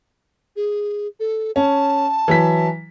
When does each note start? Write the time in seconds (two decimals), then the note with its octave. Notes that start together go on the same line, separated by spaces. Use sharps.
0.56 G#4
1.20 A4
1.56 C#4 A5
2.28 E3 F#3 B6